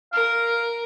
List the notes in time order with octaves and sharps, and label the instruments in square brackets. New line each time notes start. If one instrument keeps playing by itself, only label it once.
[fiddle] A#4 [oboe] F5